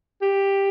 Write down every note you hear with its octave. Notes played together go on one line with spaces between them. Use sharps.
G4